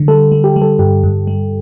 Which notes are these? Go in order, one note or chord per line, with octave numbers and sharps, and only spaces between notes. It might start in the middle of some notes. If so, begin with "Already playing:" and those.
Already playing: D3
G3 A4
G3
G4
G3
A4
G2 G4
G2
G3